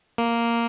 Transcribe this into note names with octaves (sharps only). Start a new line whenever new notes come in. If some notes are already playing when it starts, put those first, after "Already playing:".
A#3